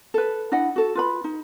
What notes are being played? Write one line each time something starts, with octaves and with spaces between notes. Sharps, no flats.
A4 B4
D4 E4 D#5 F#5
F#4 A4
F4 B4 B5
D#4